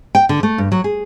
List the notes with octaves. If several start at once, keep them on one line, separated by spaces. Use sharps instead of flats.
G5
D3
A3
G2
F#3
G#4